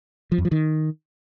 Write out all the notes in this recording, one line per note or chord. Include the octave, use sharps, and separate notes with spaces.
F3
F2
F3
D#3